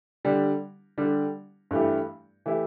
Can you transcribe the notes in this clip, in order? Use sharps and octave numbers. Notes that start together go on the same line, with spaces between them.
D3 G3 D4 G4
D3 G3 D4 G4
G2 E3 A3 E4 G4
E3 A3 E4 G4